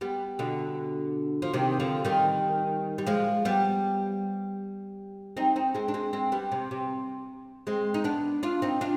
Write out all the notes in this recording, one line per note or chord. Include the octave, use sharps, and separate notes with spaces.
G3 B3
B2 D3
F3
C3 D#3
D3 F3
D#3 G3
G3
F3 G#3
G3 B3
C4 D#4
C4 D#4
G#3 C4
D4
G#3 C4
G#3 C4
G3 B3
C3
C3
G#3 C4
D#4
B3 D4
D4 F4
C4 D#4
D4 F4